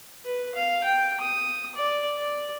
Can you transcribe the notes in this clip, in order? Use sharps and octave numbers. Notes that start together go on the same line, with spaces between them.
B4
F5
G5
D#6
D5
D5